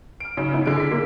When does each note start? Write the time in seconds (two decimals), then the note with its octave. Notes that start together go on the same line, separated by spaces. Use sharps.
0.20 F6 D7
0.37 C#3 F#3 D#4 C#5
0.53 G#2 B3 E4
0.66 A#1 D3 G#4 D7
0.78 G#4 B6
0.91 A#3